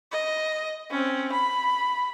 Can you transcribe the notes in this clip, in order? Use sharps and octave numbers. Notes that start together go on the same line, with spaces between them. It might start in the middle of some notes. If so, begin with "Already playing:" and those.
D#5
C4 C#4
B5